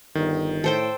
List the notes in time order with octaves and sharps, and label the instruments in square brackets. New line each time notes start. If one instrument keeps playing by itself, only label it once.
[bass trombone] G1 [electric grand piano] D#3
[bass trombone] A2 [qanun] A4 C5 G5